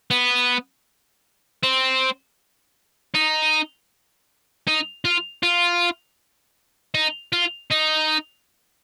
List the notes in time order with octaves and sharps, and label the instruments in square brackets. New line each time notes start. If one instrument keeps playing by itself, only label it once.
[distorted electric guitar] B3
C4
D#4
D#4
F4
F4
D#4
F4
D#4